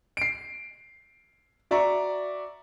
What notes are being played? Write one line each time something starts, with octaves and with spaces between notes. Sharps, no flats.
C7 D7
F#4 D5 E5 A#5 C#6